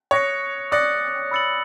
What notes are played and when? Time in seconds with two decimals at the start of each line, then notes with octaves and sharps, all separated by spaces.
0.11 C#5 D#6 F#6 A#6 C#7
0.72 D5 D#6 F#6 A#6 C#7
1.31 B5 E6 A6 C#7 F#7